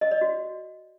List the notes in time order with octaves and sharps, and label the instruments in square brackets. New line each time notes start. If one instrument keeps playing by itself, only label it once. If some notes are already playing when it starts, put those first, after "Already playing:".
[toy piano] D#5
D5
F#4